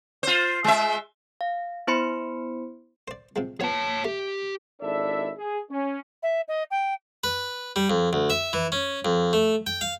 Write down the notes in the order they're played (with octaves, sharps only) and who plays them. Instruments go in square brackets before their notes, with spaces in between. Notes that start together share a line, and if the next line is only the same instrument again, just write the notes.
[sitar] F4 C5
G#3 E5
[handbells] F5
B3 E4 C5 B5 C6 C#7
[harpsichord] C5 D5
C3 F3 G#3
[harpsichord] F3 B3 [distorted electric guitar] C#5 A5
[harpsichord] A3 [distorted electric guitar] G4
[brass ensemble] G#1 D4 E4 A4 D5 E5
G#4
C#4
[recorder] E5
D#5
G5
[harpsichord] B4
G3
F2
D2
E5
E3
C#4
F2
A3
G5
F5